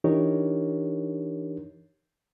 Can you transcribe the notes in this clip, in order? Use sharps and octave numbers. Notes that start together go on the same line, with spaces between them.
E3 D4 D#4 G4 A#4 C#5